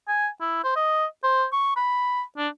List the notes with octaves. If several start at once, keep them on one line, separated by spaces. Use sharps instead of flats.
G#5
E4
C5
D#5
C5
C#6
B5
D4